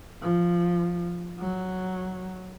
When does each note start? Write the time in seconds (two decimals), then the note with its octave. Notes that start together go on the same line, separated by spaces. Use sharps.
0.21 F3
1.39 F#3